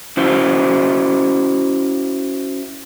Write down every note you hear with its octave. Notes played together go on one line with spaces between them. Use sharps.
C#4 E4 F#4 C5